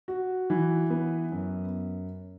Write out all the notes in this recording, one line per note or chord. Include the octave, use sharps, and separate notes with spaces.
F#4
E3
B3
F#2